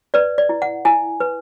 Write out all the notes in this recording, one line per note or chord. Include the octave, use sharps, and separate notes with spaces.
B4 D5
D5
E4
F#5
E4 G#5
B4